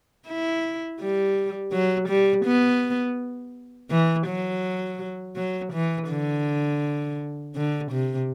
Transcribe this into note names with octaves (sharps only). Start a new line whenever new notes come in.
E4
G3
F#3
G3
B3
E3
F#3
F#3
E3
D3
D3
C3